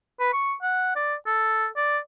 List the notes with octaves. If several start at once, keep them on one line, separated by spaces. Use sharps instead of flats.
B4
C#6
F#5
D5
A4
D5